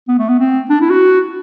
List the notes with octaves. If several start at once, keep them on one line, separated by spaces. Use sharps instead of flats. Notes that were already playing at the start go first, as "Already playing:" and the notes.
B3
A3
B3
C4
D4
E4
F#4